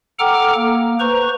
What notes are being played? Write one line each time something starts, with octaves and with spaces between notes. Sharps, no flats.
A4 F#5 G5 A#5 D6 F6
A#3
B4 C5 A#5 C#6